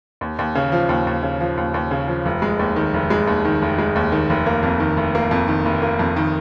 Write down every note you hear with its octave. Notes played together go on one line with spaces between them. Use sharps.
D#2
D#2
C#3
F3
D#2
D#2
C#3
F3
D#2
D#2
C#3
F3
F1
G#3
D#2
D#3
F1
G#3
D#2
D#3
F1
G#3
D#2
D#3
F1
A#3
F2
D#3
F1
A#3
F2
D#3
F1
A#3
F2
D#3